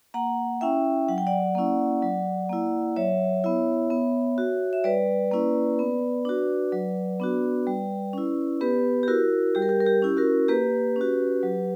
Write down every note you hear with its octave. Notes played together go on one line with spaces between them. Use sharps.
A#3 F#5 A#5
C#4 E4 E5 G5
F#3 F#5
G5
D5 F#5
A#3 C#4 E4
F#3
A#3 E4
F#3 C#5 E5
B3 E4
B3
F#4
E5
G3 B4 D5
A#3 C#4 E4
B3
D4 F#4
F#3
B3 D4 F#4
G3
C#4 E4
B3 G4 B4
G4
E4 F#4 A#4
G3 G4
A#4
G4
A#4
G4
C#4 E4
F#4 A#4
A#3 G4 B4
C#4 F#4
F#3